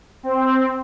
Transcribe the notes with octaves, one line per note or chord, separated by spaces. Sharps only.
C4